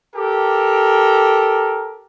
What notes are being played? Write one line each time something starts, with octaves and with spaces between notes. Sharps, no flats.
G4 A4 A#4